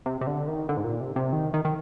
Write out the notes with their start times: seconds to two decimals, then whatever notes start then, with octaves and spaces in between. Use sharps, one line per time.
0.06 C3
0.21 C3
0.27 D3
0.47 D#3
0.69 D3
0.77 G#2
0.85 A#2
1.01 C3
1.16 C3
1.33 D#3
1.54 D#3
1.65 D#3